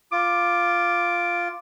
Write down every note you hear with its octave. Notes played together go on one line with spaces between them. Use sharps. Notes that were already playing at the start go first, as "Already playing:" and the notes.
F4 D6